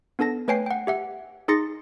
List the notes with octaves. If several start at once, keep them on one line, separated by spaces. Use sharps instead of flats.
B3 D4 A4 A5 A#6
A3 B4 C#5 G5 G#5 C7
F#5 G5
G4 E5 F#5
D#4 G#4 C6 A6 A#6 C#7